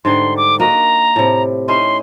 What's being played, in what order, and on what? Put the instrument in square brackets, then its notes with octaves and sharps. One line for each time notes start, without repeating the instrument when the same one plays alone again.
[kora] G#2 D3 G3 [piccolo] C6
[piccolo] D6
[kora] A#3 F#4 D#5 [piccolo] A#5
[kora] A2 C3
[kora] C#4 D#4 E4 [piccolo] C6